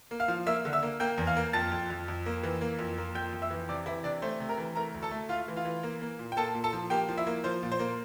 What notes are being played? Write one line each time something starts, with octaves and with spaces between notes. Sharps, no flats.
A#3
F5 F6
F3
A#3 E5 E6
D3
E5 E6
A#3
A#3 G5 G6
E2
F5 F6
A#3
F2 A5 A6
F2
F2
F2
A#3
E3
A#3
F2
A#3
F2 G5 G6
F2
E5 E6
E3
C3 D5 D6
E3 E4 E5
C3 D4 D5
A3 C5
C3
A#4 A#5
E3
A3 A#4 A#5
D2
A4 A5
A3
A3 F4 F5
E3
F4 F5
E3
A#3
A#3
A#2
G5
A#3 A4 A5
A#2
A4 A5
F3
A#3 G4 G5
F3
E4 E5
A#3
F3 C5
A#2
C5
A#3